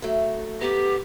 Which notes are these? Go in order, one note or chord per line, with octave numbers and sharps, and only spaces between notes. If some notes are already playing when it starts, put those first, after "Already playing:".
F#3 A3
B3 G4 A#5